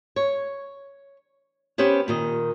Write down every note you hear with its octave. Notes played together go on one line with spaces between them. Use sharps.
C#5
B3 C#4 G4 B4 C5
A#2 D#3 D#5